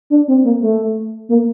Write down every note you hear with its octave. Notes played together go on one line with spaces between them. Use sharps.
D4
C4
A#3
A3
A#3